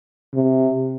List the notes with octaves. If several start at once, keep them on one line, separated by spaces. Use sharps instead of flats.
C3